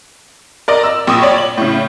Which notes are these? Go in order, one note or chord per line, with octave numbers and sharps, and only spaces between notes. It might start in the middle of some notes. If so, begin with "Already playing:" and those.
A#4 D5 D#5
E6
A#1 C#6 D#6
C#5 D5
F#7
A2 C#3